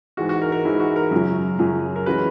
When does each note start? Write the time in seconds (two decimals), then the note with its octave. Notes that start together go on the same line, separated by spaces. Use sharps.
0.17 G#2 E3 G#3 F#4
0.29 F#4
0.42 A#4
0.52 A#4
0.65 G#2 E3 G#3 E4
0.80 F#4
0.96 A#4
1.11 F#2 C#3 F#3
1.59 F#2 C#3 F#3
1.96 A#4
2.06 E3 G#3 C#4 F#4 B4